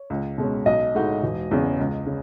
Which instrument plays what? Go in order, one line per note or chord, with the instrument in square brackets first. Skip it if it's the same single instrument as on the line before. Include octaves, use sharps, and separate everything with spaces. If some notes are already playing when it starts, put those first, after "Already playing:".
Already playing: [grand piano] C#5
[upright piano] C#2
B2 G#3 C#4
[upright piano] B1 [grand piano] D#5
[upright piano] A2 G#3 D#4 F#4
E1
E2 C#3
C#2
C#3